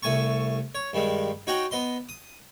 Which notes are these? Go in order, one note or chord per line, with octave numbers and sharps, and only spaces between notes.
C2 A3 G#5 A5 C#6
C#5
G2 D#3 G3 G#3
D#4 F#4 C#5 F#5 G5
B3 D#5 C6
D#6